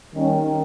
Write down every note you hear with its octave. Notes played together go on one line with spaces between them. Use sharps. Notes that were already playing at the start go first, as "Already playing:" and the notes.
D#3 G3 A#3 C#4